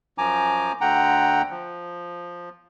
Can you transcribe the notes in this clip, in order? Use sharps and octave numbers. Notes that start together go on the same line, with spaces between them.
F#2 F3 G#5 A#5 D6
D2 D3 F#5 G5 A#5
F3